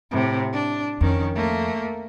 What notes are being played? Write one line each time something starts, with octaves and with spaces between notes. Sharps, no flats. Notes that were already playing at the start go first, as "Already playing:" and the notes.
A2 C3
D4
F2 D#3 C#4
A3 A#3